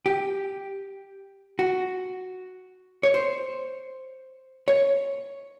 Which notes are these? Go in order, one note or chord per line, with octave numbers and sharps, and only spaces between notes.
G4
F#4
C#5
C5
C#5